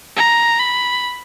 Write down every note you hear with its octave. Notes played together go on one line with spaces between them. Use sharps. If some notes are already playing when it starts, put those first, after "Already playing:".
A#5
B5